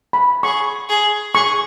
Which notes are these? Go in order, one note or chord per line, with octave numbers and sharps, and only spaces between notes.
B5
G#4 C#6
G#4
G#4 C#6